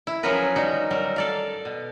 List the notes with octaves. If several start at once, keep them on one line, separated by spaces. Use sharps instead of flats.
E4
F3 F#3 C#4 G#4 A#4 B4
G3 D#4 F#4
F#3 G3 A#4
A4 D5 F5
B2